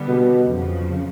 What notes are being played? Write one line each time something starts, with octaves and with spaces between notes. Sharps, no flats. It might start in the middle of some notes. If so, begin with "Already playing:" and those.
Already playing: D3 G3 B3
B2
F2 C#3 F3